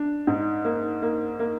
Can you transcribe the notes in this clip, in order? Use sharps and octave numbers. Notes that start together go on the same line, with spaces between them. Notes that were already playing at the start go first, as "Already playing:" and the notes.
Already playing: D4
G#2
A#3
A#3
A#3